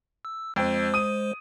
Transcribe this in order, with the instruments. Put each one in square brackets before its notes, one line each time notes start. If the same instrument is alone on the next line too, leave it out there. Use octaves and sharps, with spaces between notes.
[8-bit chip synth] E6
[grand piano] F2 [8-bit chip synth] G#3 C5
[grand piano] D#6 D#7